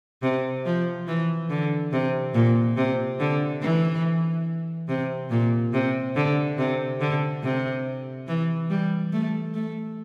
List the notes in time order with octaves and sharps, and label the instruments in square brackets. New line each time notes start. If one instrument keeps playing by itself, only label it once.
[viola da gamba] C3
F3
E3
D3
C3
A#2
C3
D3
E3
C3
A#2
C3
D3
C3
D3
C3
E3
G3
A3
A3